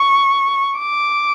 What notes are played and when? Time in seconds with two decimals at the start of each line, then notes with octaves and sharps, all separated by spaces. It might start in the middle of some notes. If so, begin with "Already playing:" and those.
Already playing: C#6
0.79 D6